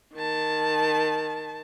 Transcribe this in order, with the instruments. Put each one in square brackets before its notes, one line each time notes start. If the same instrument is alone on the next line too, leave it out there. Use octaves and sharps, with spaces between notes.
[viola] D#3 A5